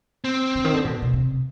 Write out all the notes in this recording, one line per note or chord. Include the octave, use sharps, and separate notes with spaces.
C4
D3
D#3
D3
B2
B2
C3